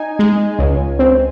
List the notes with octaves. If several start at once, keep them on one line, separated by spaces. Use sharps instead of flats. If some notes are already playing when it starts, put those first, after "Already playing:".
Already playing: D#4 G#5
G#3
C#2
C4